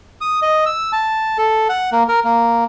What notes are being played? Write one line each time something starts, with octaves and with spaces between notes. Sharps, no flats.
D#6
D#5
E6
A5
A4
F#5
A#3
A#4
A#3